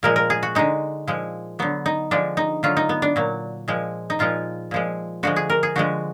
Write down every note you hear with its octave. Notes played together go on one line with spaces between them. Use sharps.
A#2 F3 G#3 A#4
A#4
G#4
F#4
D3 G#3 D#4
A#2 F3 G#3
D3 F#3 B3
D#4
D3 F3 G#3 D4
D#4
D3 F#3 F4
D#4
B3
D4
A#2 F#3
A#2 F3 G#3
D#4
A#2 F3 G#3 F4
A#2 F3 G#3
D3 F3 G#3 F#4
G#4
A#4
G#4
D3 F3 G#3 F#4